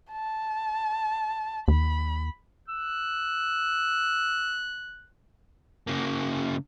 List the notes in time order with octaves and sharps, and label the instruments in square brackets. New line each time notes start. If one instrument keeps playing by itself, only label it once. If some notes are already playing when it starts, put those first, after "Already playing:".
[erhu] A5
[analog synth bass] D#2 [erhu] B5
[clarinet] E6 [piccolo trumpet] F#6
[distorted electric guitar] C#3 A#3